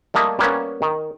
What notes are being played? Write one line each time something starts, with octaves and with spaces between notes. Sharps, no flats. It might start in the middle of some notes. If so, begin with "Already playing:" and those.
G3 A3 A#3 A4 D#5 E5
G3 A#3 B3 C#4
D#3